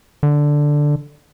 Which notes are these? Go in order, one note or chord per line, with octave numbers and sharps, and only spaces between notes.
D3